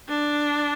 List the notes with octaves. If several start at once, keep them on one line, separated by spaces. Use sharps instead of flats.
D4